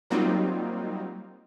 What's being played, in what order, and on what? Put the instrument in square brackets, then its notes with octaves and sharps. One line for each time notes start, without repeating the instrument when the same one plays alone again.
[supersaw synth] F#3 G3 A#3 C4 D#4 F4